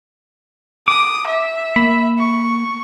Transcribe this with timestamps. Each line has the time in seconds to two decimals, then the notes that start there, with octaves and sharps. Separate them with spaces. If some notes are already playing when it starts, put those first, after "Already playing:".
0.88 D6 D#6
1.27 E5
1.76 A#3 B5
2.19 C#6